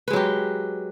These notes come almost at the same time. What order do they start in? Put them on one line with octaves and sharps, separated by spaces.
B4 G#3 F#3 G4